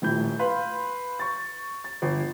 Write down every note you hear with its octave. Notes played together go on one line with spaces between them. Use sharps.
D#1 A2 G6
B4 F5 B5 C6
C#6 A6
A6
G1